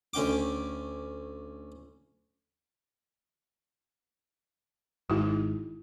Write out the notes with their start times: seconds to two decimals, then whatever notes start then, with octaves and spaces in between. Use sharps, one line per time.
0.14 D2 C#4 G5 D6
5.10 G#1 G#2 E4 F#4